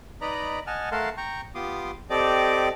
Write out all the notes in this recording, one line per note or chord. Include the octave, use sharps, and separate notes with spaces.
D#4 B4 D5 D#5 A#5 B5
D#5 F#5 G#5 A5 F6
A3 A#4 F5 F#5 A5 C6
G5 A#5 C#6
B3 F4 G4 C6 D6 D#6
C4 G4 A4 D5 D#5 D6